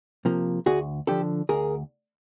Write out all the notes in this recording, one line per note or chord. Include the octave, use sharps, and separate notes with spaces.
C3 F3 A#3
D2 F#4 G#4
D3 F3 G4 A4
D2 G#4 A#4